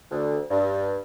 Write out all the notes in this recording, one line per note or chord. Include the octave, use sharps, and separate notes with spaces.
D2
G2